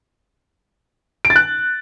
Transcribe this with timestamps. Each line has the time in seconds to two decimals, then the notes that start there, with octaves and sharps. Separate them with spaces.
1.25 D7
1.30 A6
1.36 F#6